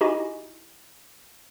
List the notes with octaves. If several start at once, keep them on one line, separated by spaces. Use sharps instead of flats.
D#4 E4 F#4 G4 D#5 G#5